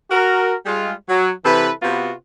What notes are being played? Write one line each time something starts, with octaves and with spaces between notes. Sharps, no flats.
F#4 A#4
G3 G#3 F4
F#3
C3 E3 E4 A4 B4
C3 B3 C4 F4 F#4 B4